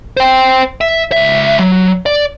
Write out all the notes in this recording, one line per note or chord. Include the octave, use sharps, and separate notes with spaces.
C5 G5
E5
C#2 E5
F#3
D5